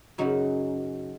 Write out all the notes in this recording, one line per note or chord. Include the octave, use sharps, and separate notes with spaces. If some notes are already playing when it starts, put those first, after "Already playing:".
F#2 C#3 F#3 D#4 F#4